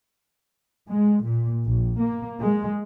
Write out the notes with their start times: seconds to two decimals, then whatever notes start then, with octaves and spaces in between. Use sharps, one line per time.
0.89 G#3
1.24 A#2
1.65 A#1
1.99 A#3
2.42 G#3